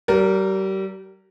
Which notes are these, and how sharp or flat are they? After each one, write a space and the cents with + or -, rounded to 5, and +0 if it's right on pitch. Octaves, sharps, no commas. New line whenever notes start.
G3 -35 A#4 -10